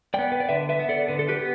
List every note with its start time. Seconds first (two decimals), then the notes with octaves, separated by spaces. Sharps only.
0.14 B3 D5 G5
0.32 B4
0.40 D5
0.49 D3 B4 E5
0.69 B4 E5
0.79 B3
0.89 A4 D5
1.08 D3 B4
1.19 A4
1.28 G4 B4
1.38 B3